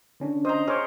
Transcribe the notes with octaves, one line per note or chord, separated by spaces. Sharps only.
D3 C#4 D4
C5 D#5 A#5
G#4 C5 C#5 D6 F6